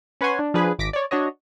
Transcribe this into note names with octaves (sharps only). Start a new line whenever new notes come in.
C#4 B4 C#5 F#5 G#5 C6
D4
F3 D4 G#4 B4
G#1 D6 A#6 B6 D7
C#5 D5
D4 F#4 C#5 D#5